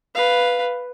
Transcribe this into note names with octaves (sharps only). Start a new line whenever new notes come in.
B4 F5